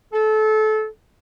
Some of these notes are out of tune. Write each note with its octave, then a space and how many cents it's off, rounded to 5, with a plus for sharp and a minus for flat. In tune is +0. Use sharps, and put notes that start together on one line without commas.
A4 -25